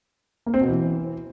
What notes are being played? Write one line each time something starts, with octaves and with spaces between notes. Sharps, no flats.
A#3
C4
B2
E3